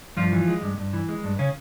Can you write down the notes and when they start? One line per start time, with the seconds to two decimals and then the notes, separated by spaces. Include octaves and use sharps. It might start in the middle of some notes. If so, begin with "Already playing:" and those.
0.17 G2 F3 F4
0.32 E3
0.48 G#3
0.62 G2
0.78 G2
0.93 E3
1.09 G#3
1.24 G2
1.39 C#3 C#4